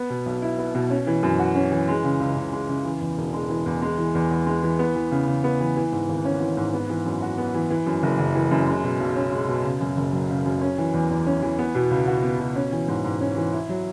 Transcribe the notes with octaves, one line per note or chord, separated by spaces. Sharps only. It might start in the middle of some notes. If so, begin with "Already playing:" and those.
Already playing: B3
B2
B1
E4
B3
B2
C#4
E3
F#2
F#4
C#4
E3
G#3
C#3
C#2
C#2
G#3
C#3
E3
E2
E1
G#3
E3
E2
G#3
E3
E2
E2
G#3
E3
B3
E3
C#3
C#3
B3
E3
E3
G#2
G#1
C#4
E3
G#2
B3
E3
F#2
F#4
B3
E3
E3
F#2
F#1
F#1
E3
F#2
G#3
B2
B1
C#4
G#3
B2
C#3
F#2
F#1
F#3
C#3
F#2
C#4
E3
E2
E2
C#4
E3
B3
B2
C#2
F#4
B3
B2
C#4
E3
G#2
G#2
C#4
E3
E4
F#3